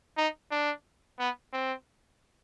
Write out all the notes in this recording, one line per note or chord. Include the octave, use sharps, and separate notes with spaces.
D#4
D4
B3
C4